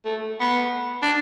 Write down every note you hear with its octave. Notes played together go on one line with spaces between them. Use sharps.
A3
B3
D4